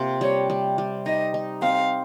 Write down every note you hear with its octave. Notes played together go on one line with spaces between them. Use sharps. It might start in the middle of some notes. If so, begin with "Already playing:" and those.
Already playing: C3 A#3 F4
G3 C#5
G3
G3
D#4 D#5
D#4
C4 F5